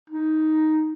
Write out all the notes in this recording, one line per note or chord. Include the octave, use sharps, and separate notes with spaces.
D#4